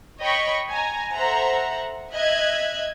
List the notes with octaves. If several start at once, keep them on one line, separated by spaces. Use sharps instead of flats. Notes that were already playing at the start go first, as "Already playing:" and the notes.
C#5 D#5 G5 B5 C#6
G#5 A#5
A4 C5 E5 F#5 A#5
D#5 E5 F#6 G#6